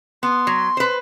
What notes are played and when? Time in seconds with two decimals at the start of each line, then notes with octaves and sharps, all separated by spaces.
0.23 B3 C6
0.47 F#3
0.77 B4 C5